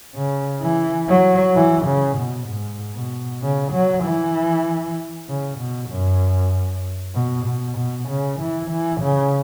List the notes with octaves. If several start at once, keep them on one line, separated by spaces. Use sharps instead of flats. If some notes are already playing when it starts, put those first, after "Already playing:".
C#3
E3
F#3
E3
C#3
B2
G#2
B2
C#3
F#3
E3
C#3
B2
F#2
B2
B2
B2
C#3
E3
E3
C#3